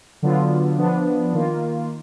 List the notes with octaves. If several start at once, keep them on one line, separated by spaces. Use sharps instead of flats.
D3 F#3 B3 F4
F3 B3 D4
D#3 A#3 F4